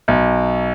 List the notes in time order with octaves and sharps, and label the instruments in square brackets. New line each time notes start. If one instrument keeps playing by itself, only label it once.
[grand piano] B1